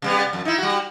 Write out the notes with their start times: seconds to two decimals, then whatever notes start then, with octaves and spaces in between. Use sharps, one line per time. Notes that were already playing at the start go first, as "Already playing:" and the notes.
0.02 C3 G3 B3
0.33 F2
0.45 D#4 E4
0.58 G3 F#4